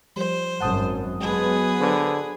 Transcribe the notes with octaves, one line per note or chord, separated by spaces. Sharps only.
F3 G3 C5
G#1 F#2 F#5 A5 D#6
F#3 G#3 B3 G#4 B4
D3 C5